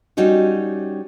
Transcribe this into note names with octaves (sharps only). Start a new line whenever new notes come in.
G3 C#4 D#4 F#4 C#5